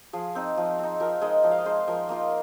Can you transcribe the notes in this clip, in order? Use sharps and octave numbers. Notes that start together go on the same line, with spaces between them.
F3 G#4
C4 D#4
F3
C4 D#4
F3 A#4
G#3 D#4 D#5
F3 D#5
F5
D#5
G#3 D#4 C5
F3 A#4
A#3 F4 D#5